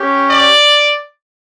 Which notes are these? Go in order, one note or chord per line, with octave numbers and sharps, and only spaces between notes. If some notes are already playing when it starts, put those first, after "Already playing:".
Already playing: C#4 G4
D5